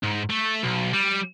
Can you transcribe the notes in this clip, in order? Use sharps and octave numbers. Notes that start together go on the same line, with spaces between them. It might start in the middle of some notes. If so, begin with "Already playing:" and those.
G#2
A3
B1
G3